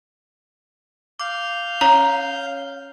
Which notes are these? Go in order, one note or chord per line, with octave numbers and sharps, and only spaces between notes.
F5 D6 G6
C#4 C#5 A#5